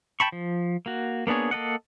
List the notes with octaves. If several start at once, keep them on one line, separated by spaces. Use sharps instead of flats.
G5 A5 B5 C#6
F3
A#3 F#4
A#3 B3 D4 G#4 C#5
A#3 A4 D#5 F#5